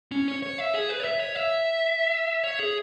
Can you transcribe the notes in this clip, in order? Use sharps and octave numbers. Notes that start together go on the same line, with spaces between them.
C#4
C#5
C#5
E5
G#4
B4
C#5
E5
C#5
E5
C#5
G#4